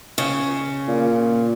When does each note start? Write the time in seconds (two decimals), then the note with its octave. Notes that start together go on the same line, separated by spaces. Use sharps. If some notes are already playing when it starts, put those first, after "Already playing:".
0.18 C#3
0.88 A#2